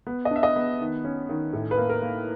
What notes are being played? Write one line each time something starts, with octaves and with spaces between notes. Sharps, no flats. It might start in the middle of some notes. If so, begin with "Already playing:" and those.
B3
D#5
D4 E5
D#5
B3
D#3
C#4
D#3
A2
B4
A#3
A#4
A#3